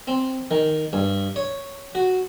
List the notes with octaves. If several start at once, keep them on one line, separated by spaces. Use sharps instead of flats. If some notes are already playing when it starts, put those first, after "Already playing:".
C4
D#3
G2
C#5
F#4